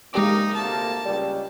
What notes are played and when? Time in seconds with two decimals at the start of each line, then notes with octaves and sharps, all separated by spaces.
0.13 C#3 E3 G#3 A#3 D#4 G4 D6
0.55 D2 C3 A#3 A5
1.06 C#2 G3